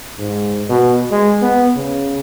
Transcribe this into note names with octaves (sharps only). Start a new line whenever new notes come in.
G#2
B2
G#3
B3
C#3